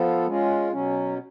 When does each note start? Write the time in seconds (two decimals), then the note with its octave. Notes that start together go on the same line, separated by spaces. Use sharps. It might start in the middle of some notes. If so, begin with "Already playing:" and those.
Already playing: F3 B3 F4 A4
0.26 G#3 C#4 F4
0.72 B2 F#3 C#4